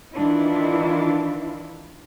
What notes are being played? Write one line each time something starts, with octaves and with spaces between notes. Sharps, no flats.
D#3 E3 D4 E4 F4